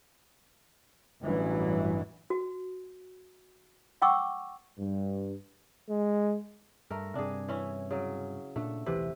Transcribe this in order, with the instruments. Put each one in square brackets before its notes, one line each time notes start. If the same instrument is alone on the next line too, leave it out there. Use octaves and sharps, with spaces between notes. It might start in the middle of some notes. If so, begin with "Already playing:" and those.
[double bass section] A1 G2 E3 F#3
[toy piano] F#4
F#5 G5 C#6 D6 E6
[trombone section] G2
[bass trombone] G#3
[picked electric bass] G2 [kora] A3 A#4
[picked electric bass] G2 C3 [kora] D4 G#4
[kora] E3 C#4 E4
C#3 F#3
[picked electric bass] A#2 D4 [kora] A3
[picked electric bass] D#1 B1 E3 [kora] C3 B4